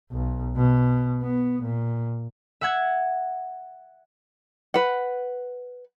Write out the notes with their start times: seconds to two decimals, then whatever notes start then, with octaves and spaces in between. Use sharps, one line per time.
0.11 B1
0.56 B2
1.22 B3
1.62 A#2
2.61 E5 F#5 G#6
4.74 B4 F#5